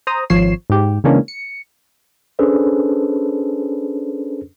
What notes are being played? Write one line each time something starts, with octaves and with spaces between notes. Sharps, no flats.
C5 A#5 D#6
G#1 F3 C#5 C7 E7
G#2 G4
C#3 E3 G#3 A#3 C#4 D4
C#7
C#4 D4 G#4 A4 B4 C5